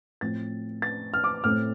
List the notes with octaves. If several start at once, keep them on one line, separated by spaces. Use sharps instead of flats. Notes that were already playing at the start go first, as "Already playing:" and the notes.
A2 F3 C4 A6
A6
F6
D6
A2 A3 C4 F6